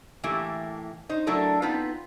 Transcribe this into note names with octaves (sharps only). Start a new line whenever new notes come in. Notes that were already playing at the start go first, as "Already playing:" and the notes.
A2 E3 A3 A#3 E4 G4
D#4 C5
F#3 A3 D4 E4 A4 A#4
B3 C4 D#4 F4 B4